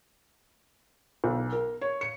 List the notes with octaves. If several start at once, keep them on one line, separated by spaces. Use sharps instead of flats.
B1
A#4
C#5
C#7